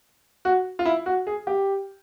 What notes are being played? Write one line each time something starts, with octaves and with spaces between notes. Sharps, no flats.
F#4
F4
E4
F#4
G#4
G4